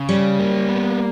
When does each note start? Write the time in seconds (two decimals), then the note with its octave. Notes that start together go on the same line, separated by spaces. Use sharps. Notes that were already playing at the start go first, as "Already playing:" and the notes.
Already playing: C#3
0.09 G3 C#4
0.39 A#3
0.69 B3